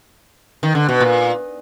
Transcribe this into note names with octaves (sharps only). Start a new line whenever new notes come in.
D#3
D3
B2
A#2